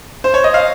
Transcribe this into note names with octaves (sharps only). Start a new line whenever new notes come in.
C5
C#5
D#5
F5